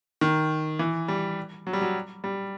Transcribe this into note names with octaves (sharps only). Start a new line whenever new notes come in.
D#3
E3
G3
F#3
G3
F#3
G3